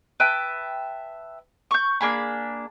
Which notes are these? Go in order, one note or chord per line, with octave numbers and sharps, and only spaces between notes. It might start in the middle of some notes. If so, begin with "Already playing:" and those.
B4 E5 G5 A5
C#6 G6
A#3 D4 G#4 B5